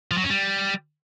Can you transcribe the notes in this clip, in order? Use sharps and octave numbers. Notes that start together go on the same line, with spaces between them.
F3
F#3
C#4
G3